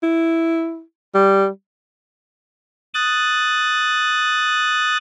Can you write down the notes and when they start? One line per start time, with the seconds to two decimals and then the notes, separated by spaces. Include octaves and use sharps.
0.03 E4
1.15 G3
2.94 D#6 F#6 A6